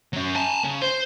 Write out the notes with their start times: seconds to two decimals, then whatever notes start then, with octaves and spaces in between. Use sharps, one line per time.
0.13 F#3 C#4
0.34 G#5 A5
0.64 C#3
0.82 C5